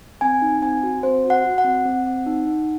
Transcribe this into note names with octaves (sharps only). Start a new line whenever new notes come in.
C4 G#5
D#4
C4 G#5
F#4
C4 C5
F#4
F#5
F#4
F#5
C4
C4
C4
D#4
D#4